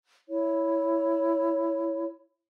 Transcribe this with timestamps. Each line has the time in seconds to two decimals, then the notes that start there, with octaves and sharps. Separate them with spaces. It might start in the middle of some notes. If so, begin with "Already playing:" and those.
0.28 E4 C#5